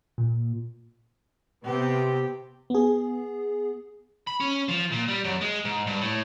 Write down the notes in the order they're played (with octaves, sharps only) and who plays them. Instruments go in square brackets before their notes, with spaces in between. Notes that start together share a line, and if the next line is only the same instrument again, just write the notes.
[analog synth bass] A#2
[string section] C3 B3 C4 [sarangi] G4
[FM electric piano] B3 G#4
[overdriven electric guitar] B5
C#4
F3
A#2
G3
F#2
G#3
G#2
G2
A2